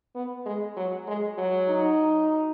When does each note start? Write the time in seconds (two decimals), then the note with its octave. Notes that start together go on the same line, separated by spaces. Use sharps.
0.15 B3
0.46 G#3
0.77 F#3
1.08 G#3
1.38 F#3
1.69 D#4